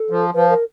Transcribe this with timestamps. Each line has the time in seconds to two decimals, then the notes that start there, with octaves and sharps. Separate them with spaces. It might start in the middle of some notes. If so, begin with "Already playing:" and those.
Already playing: A4
0.10 F3
0.34 F3 B4
0.49 A#4